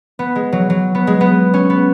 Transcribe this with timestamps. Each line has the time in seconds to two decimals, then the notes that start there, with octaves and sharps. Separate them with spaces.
0.19 B3
0.36 G#3
0.52 F#3
0.70 F#3
0.95 B3
1.07 G#3
1.21 B3
1.54 C#4
1.70 B3